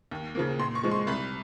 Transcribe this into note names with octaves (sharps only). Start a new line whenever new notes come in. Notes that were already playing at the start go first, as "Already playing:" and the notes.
D#2
C#3 F3 A#3
A#2 C6
C#6
F3 G#3
C6
C2 B5